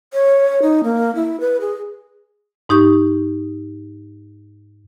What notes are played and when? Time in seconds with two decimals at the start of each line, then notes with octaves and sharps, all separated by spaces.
0.13 C#5
0.62 D#4
0.84 A#3
1.15 E4
1.40 B4
1.61 G#4
2.69 G#2 D#4 G4 C#6